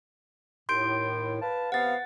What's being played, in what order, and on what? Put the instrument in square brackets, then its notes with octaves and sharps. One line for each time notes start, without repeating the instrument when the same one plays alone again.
[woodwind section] D#2 A2 [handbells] C6 G6 D7
[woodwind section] B4 F5 A5
[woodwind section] C3 B3 F5 [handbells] F#5 A6